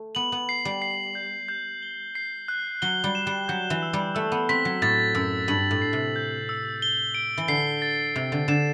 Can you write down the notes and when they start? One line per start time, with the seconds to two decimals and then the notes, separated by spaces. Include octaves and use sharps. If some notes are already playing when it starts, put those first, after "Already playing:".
Already playing: A3
0.15 B3 F#7
0.32 B3
0.49 C7
0.65 G3
0.82 C7
1.15 G6
1.48 G6
1.83 G7
2.15 C7
2.48 F#6
2.82 F#3 G7
3.04 G3
3.15 E7
3.27 G3
3.48 F#3 G6
3.70 E3
3.82 E6
3.93 G3
4.15 A3 E6
4.32 B3
4.49 C4 B6
4.65 F#3
4.82 A2 A6
5.15 F#2 E6
5.48 G2 F#7
5.71 A2
5.82 C7
5.93 C3
6.16 G6
6.49 E6
6.82 G7
7.15 D7
7.38 E3
7.48 D3 C7
7.82 A6
8.15 C3 G7
8.32 D3
8.48 D3 E7